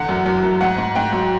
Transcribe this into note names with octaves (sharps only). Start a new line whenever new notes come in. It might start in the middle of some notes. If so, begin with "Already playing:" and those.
Already playing: E2 D3 F#5
F#2
F#2
F#2
G#2 F#5
G#2
G#2 G5
F#3